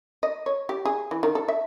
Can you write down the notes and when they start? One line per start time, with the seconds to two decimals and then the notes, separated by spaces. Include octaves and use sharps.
0.23 D#5
0.46 C#5
0.69 G4
0.85 G#4
1.11 E3
1.23 D#3
1.35 A4
1.48 E5